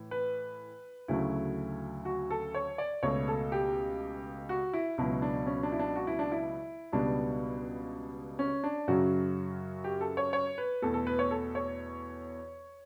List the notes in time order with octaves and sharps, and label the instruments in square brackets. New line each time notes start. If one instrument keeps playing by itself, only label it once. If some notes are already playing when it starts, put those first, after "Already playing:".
Already playing: [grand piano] A2 E3
B4
D2 C#3 F#3 A3 E4
F#4
A4
C#5
D5
C#2 B2 A3 C#5
A4
G4
F#4
E4
C#2 B2 F#3 E4
D4
C#4
D4
E4
D4
F#4
E4
D4
E4
C#2 B2 G3 B3 D4
C#4
D4
F#2 C#3 F#3 F#4
G4
A4
C#5
C#5
B4
E2 B2 A3 A4
A4
B4
C#5
A4
C#5